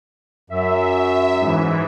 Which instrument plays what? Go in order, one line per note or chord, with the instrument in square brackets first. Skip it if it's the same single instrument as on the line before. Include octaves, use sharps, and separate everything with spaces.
[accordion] F#2 [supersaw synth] E5
[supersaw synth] G#2 E3